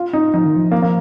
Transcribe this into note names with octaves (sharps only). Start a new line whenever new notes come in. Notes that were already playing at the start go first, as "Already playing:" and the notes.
Already playing: F4
D#4
F3 D#4
D#3
F3
A#3
A#3